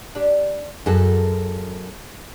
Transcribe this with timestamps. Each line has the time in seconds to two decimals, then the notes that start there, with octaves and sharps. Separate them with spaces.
0.15 D4 G4
0.86 F#2 F#4 G#4 A4